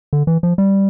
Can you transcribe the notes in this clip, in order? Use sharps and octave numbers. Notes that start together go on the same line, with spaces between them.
D3
E3
F3
G3